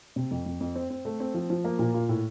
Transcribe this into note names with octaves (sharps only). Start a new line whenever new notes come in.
C3
F2
F2
F2
C4
C4
A3
C4
F3
F3
A#3
A#2
F4
A2